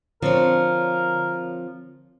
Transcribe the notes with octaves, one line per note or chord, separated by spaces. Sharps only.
D3 F3 C4 A#4 C#5